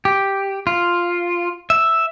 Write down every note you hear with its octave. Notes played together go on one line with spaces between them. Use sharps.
G4
F4
E5